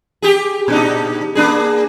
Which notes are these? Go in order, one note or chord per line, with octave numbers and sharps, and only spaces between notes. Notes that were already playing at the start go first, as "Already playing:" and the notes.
G4 G#4
A#2 D4 D#4
A#3 D4 G#4